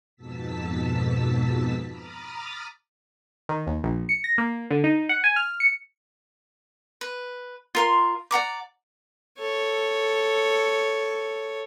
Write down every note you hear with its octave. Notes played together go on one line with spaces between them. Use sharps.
F2 G#2 B2 A5 E6 B6
A#5 B5 D6 D#6 F6 A6
D#3
D#2
A#1
C#7
A#6
A#3
D3
D#4
F#5
G#5
F6
C#7
B4
F4 A#4 C6
D5 F#5 A#5 D6
A4 C#5